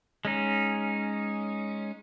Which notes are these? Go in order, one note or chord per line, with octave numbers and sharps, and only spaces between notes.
G#3 C#4 D#4